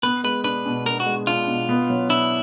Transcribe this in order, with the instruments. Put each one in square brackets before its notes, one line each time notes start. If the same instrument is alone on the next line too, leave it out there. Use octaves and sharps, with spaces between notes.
[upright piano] B3 [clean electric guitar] B4
[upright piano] G#3 [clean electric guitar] B4
[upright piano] D4 [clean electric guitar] B4
[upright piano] B2
[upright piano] B3 [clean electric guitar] A#4
[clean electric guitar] F#4
[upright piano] G#3
[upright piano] D4 [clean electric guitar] F4
[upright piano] B2
B3
F#3
[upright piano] D4 [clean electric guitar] E4